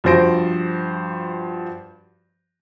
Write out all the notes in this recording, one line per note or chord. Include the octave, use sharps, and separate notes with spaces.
G2 F3 F#4 C5 A#6 D7